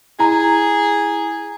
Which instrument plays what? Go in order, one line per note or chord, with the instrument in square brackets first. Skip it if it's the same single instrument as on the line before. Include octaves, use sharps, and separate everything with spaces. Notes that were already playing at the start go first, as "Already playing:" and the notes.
[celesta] E4 A#5 [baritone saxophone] G#4